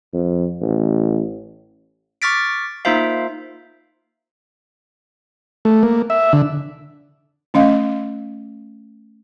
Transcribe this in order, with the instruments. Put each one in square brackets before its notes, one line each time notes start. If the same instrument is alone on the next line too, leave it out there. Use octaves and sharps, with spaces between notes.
[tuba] F2
A1
[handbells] C#6 D6 F6 A6 B6 D7
A#3 D#4 F4 C5 E5 F5
[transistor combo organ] A3
A#3
E5
D3
[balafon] A3 C#4 D#5 F5